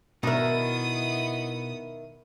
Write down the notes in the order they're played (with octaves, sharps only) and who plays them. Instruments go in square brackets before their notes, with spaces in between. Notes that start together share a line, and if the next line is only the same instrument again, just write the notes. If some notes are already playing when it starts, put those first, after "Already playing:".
[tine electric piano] B2 [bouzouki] D#3 E4 [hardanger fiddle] B3 D#6 [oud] D4 A#4